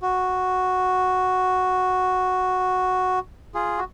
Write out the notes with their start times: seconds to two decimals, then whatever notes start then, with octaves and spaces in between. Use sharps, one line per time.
0.02 F#4
3.54 F4 G#4
3.78 F#4